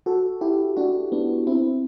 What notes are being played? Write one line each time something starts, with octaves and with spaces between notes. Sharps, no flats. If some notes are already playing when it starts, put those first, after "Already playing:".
F#4 A4
E4 G4
D4 F#4
B3 D4
C4 E4